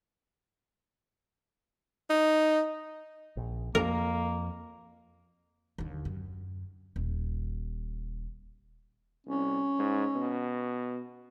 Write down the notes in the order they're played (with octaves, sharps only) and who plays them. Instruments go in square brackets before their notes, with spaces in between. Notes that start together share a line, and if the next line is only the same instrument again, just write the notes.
[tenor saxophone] D#4
[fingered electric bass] A#1
[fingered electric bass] F2 [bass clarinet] A#3 [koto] A#4
[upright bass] D#2 D3
F#2
D#1
[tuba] C2 [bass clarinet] C#4
[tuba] G#2
B2